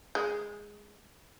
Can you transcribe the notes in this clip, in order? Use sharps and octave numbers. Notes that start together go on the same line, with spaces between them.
G#3